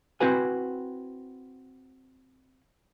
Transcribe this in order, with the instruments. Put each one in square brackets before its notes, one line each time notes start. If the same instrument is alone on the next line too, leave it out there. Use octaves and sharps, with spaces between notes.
[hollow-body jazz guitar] C4 E4 F#4 B4 G#5